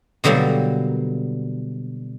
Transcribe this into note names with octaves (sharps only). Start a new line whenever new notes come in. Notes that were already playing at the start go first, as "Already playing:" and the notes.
B2 D3 F#3 G3 A#3